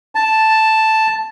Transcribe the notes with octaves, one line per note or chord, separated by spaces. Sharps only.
A5